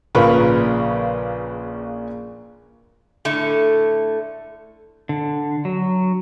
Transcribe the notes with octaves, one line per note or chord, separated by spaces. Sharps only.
A#1 C#3 F4 A#4 B4 B5
A2 D3 A3
D3
F#3